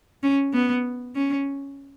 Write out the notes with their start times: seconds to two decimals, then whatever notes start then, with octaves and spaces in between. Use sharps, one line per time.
0.23 C#4
0.53 B3
1.15 C#4